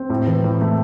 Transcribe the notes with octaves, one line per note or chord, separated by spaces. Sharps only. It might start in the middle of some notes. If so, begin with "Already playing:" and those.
Already playing: C4
A2
E3
A2
A3